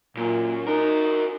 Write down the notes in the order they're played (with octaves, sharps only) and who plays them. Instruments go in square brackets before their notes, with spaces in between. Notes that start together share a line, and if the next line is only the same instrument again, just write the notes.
[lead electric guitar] F#2 [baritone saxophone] A#2
[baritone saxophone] D#4 [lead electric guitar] F#4 A#4